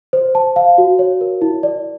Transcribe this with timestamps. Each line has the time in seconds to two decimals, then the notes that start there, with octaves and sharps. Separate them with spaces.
0.13 C5
0.35 A5
0.56 F5
0.78 F#4
0.99 C#5
1.21 A#4
1.42 E4
1.63 D5